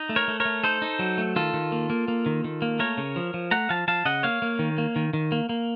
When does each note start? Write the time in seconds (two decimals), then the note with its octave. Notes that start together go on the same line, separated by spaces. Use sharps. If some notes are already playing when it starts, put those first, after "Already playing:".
Already playing: D#4
0.09 A3
0.16 A#4 C#5
0.28 A3
0.40 A#4 C#5
0.45 A3
0.64 D#4 A4 C5
0.82 D#4
0.99 F#3
1.18 A3
1.36 D#3 F4 A4
1.54 D#3
1.72 A#3
1.90 A#3
2.08 A#3
2.26 D#3
2.44 D#3
2.62 A#3
2.79 A3 A#4 C#5
2.97 C#3
3.16 F3
3.34 F3
3.51 A3 F#5 A#5
3.69 F3 F5 A5
3.88 F3 F5 A5
4.05 C#3 D#5 F#5
4.23 A#3 C#5 F5
4.42 A#3
4.59 D#3
4.78 A#3
4.96 D#3
5.13 D#3
5.32 A#3
5.49 A#3